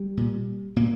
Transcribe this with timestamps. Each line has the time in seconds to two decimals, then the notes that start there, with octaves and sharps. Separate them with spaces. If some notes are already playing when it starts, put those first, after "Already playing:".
Already playing: G3
0.17 A#2
0.76 A#2 A#3